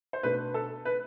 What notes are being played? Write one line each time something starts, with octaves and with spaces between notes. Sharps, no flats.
C5
B2 A3 D4 B4
A4
B4